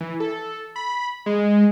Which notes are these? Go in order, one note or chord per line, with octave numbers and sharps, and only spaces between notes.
E3
A4
B5
G#3